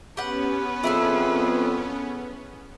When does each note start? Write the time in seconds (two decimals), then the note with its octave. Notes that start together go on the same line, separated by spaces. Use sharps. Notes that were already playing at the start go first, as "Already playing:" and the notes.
0.17 B3 C#4 G4 B4 F#5
0.83 F2 E4 G#4 A4